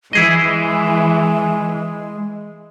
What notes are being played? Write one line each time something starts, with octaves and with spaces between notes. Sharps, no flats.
E3 G#3 E4 G#4 D#5